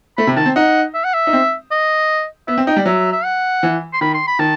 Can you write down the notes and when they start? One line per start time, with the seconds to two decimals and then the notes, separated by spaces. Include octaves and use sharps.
0.17 A3 B5
0.27 C3
0.36 D#3 A5
0.46 C4
0.56 D#4 F#5
0.94 E5
1.04 F#5
1.14 E5
1.27 D#4
1.33 C4
1.71 D#5
2.48 B3 E5
2.58 C4
2.67 D#4 G5
2.76 G3
2.85 F#3 E5
3.12 E5
3.24 F#5
3.63 E3
3.93 C6
4.01 D#3 B5
4.14 C6
4.27 B5
4.39 D#3 A5